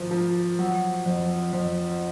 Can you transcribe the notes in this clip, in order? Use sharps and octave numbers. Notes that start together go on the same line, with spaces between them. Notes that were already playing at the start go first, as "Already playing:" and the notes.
Already playing: G#1 F3
F3
F#3
F2
F2